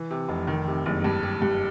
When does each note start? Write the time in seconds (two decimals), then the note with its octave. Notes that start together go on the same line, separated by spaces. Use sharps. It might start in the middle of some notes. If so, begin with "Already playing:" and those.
Already playing: E3
0.11 C3
0.28 F1
0.47 D#3
0.67 C3
0.86 F#1
1.04 G2
1.23 G3
1.42 G2